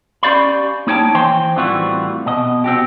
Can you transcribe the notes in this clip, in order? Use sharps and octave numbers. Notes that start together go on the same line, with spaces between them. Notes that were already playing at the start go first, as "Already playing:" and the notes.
C#4 G4 D5 F5 B5
A#3 D#4 C#5 G5 A5
E3 C5 G5 C6
A2 E3 G3 C4 F4 F#4
B2 D#5
C4 F#4 G4